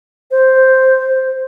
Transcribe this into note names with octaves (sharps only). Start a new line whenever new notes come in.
C5